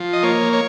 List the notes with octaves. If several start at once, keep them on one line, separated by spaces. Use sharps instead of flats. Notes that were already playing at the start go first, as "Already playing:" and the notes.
Already playing: F3
D#5
A#3 C#5
C#5